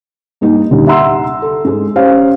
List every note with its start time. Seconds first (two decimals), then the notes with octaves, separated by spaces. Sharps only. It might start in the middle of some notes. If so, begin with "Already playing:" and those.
0.41 G2 A#3 D#4
0.71 D#1 D3 G3 D#4
0.87 E5 F#5 A#5 C6 E6
1.42 A4
1.65 G#2 G#3
1.96 C#4 G4 C5 F5